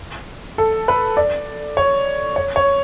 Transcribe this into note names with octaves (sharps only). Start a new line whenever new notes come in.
A4
B4
D5
C#5
C#5
C#5